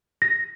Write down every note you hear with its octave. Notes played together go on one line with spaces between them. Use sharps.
A#6